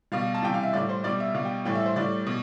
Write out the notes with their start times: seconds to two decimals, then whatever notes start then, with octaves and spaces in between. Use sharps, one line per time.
0.12 B2 G3 F5
0.34 A5
0.42 C3 E3 G3 G5
0.54 F5
0.63 E5
0.73 A2 G3 D5
0.89 C5
1.04 B2 G3 D5
1.20 E5
1.35 B2 G3 F5
1.45 G5
1.65 A2 E3 G3 G5
1.75 E5
1.86 C5
1.96 A2 G3 D5
2.27 B2